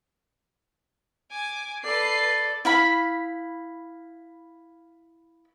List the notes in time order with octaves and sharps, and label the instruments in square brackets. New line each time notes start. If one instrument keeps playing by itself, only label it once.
[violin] G#5 D6
[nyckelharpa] A4 D5 [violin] B4 C7
[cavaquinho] E4 F5 B5